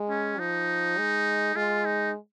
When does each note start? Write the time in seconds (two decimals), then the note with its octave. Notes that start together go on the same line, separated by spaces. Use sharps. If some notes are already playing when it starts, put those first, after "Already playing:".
Already playing: G#3
0.10 C#4
0.39 F3 D#4
0.98 G#3
1.56 G#3 F4
1.85 D#4